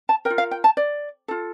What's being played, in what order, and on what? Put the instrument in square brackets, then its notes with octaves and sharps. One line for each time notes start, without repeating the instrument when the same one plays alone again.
[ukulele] A5
A#4 G5
F4
F5
G5
A5
D5
F4 A4